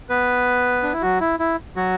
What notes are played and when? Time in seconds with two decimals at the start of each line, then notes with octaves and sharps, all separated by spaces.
0.09 B3 B4
0.83 D4
0.93 E4
1.02 F#3 F#4
1.21 E4
1.40 E4
1.76 F#3 F#4